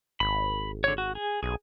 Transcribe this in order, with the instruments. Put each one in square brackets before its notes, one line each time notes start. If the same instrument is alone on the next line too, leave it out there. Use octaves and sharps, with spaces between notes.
[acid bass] G#1 [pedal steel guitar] B5
[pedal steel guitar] D3 C#5
F#4
G#4
[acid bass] B1 [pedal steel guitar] G#4